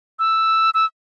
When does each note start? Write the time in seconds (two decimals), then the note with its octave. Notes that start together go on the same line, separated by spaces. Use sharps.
0.19 E6
0.74 E6